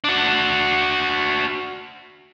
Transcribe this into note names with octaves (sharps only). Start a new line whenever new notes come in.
D4 F#4